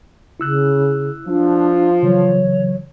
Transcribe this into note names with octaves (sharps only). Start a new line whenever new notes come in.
C#3 E4 E6 F#6
F3 D4
C#3 E3 F#3 C#5